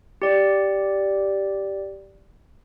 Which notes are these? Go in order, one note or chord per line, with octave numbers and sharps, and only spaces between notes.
G4 D5